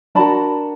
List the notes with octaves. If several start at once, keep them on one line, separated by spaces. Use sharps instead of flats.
D4 F#4 A#4 A5 B5